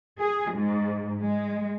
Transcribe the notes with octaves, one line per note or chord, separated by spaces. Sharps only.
G#4
G#2
G#3